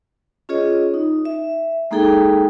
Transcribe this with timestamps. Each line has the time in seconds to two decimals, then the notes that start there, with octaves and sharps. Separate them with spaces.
0.49 C#4 F4 G#4 C#5 D#5
0.94 D#4
1.25 E5
1.91 G#3 A#3 D#4 G#4 A4 G5